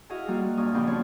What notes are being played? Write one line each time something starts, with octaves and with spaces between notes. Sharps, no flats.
E4 F#4 G#4 D#5 F5
G3 A#3 F4 F#4 G#4
G2 A#2 D4 C#5 D#6 F6
F2 C#3 B3 G4 B5 C6
B3 D4 C#5 C6